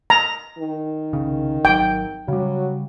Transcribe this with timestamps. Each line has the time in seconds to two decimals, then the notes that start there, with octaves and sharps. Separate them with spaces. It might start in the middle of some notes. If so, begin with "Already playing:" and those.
0.10 A#5
0.58 D#3
1.13 C2 C#3
1.65 G#1 F#3 G5
2.28 C#3 F#3 G3